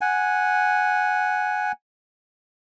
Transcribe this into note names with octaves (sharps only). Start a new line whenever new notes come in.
F#5 G#5